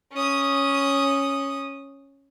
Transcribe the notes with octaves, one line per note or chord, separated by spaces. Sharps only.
C#4 D#6